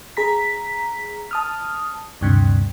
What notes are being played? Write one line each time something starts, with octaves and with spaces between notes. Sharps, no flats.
G#4 A#5 B6
A5 D#6 F6
D2 G2 C3